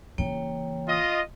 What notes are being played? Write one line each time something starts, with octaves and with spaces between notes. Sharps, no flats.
C#3 E3 A#3 C#5 G5
F4 D#5